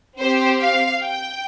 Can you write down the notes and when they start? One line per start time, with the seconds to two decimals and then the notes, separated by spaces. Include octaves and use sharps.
0.20 C4 G4 C5
0.61 F5
1.02 G5